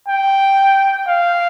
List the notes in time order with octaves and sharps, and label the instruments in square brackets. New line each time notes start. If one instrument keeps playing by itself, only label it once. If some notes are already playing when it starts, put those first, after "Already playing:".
[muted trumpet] G5
F5